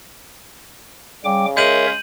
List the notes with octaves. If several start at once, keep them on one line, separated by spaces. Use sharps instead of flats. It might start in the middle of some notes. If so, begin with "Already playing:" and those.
C#3 G3 G5 D6
G#3 A#4 C#5 E5 G6 D#7 F#7